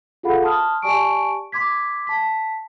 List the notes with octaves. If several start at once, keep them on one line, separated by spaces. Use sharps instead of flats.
F4 G#4 A4 F5 F#5 B5
A5 C6 D#6 F6
G4 D5 G#5 A5 C#6 D7
C6 D6 G#6 B6
A5 B6